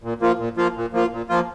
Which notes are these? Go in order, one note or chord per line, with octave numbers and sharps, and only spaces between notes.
A#2
F3 A#3 F4
A#2
F3 A#3 F4
A#2
F3 A#3 F4
A#2
F3 A#3 F4